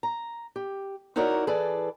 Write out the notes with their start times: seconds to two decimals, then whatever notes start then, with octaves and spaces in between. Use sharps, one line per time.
0.03 A#5
0.56 G4
1.16 D#4 E4 F#4 A#4 C#5 D5
1.47 E3 G#4 A4 B4 D5